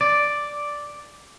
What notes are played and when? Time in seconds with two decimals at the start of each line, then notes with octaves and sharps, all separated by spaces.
0.01 D5